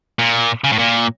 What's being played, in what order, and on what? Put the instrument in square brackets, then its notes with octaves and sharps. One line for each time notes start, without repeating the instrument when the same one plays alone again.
[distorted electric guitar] A#2
C#3
A2
A#2